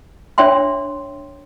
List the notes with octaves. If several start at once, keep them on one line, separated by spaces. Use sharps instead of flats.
D4 C#5 E5 G5 C6